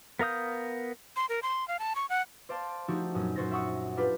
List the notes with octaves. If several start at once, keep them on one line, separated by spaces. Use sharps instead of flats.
B3 A#4 F5 D#6 G6
C6
A#4
C6
F5
A5
C#6
F#5
C5 D5 F5 A5 C6
F3 A3 D4 D#4 F#4 G4
F#2 A#2 D#6
F#2 A#2 F#4 C5 A6 A#6
E5 F#5 C#6 D#6 C#7
D4 F4 G4 B4